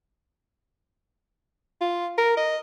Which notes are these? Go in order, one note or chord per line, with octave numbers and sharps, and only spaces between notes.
F4
A#4
D#5